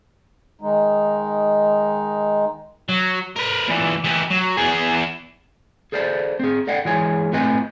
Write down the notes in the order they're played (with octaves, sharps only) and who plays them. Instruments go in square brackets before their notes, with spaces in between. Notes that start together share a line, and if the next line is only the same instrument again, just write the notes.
[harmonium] D#3 G#3 D#4
[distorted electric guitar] F#3
A#4 B4
A#2 E3
E3 G4
F#3
E2 G#4
[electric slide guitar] G#4 A4 C5 D5 A5
C4 G#4
A4 D5 D#5 F#5 G5
E3 G#3 F4 G#4 C#5 G#5
A2 C4 F4 B4 D#5 G#5